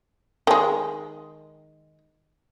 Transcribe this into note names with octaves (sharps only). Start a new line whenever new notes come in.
D#3 G#3